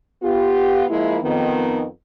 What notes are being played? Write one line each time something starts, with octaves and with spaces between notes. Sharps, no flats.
B3 F4 G4
F3 G#3 A#3 E4
F2 D#3 B3